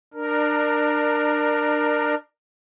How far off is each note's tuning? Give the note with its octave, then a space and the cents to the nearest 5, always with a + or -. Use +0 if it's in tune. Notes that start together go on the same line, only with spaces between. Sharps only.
D4 +25 A#4 +0